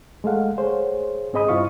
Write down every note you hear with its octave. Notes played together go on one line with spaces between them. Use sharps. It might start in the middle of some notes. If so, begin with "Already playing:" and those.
G#3 A3 A4 F5 F#5
G#4 C5 C#5
G#2 C4 G#4 D#5 B5 D#6
G2 E4 F4 C5 F5 C#6